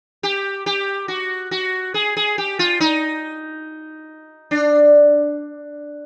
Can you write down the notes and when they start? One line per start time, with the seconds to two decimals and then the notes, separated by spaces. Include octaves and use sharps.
0.23 G4
0.66 G4
1.08 F#4
1.51 F#4
1.94 G#4
2.17 G#4
2.38 G4
2.59 F4
2.80 D#4
4.51 D4